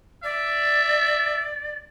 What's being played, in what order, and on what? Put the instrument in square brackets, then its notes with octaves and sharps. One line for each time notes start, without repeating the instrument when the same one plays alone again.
[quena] D5 [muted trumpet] E5